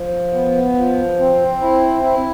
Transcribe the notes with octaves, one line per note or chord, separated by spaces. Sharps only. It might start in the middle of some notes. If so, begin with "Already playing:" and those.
Already playing: F3
B3
F3
C4
E4
E4